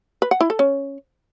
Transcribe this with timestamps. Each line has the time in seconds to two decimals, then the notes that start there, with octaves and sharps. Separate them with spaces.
0.22 B4
0.31 F#5
0.41 E4
0.50 A4
0.59 C#4